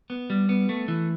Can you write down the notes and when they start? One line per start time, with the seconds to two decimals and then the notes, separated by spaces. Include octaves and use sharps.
0.10 B3
0.30 G3
0.49 B3
0.69 A3
0.88 E3